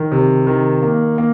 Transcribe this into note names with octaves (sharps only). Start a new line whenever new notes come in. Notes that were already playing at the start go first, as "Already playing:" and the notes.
Already playing: D#3
C3
D#3
A#3
A#3